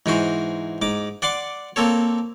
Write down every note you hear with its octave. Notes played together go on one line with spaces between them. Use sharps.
G#2 E3 F#4 C5
G#2 D6
D5 F#5 C6 D6
A#3 C4 A4 C#5